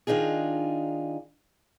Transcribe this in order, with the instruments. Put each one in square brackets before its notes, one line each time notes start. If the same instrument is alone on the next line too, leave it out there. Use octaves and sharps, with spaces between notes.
[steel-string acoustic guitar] D#3 D4 D#4 F4 G#4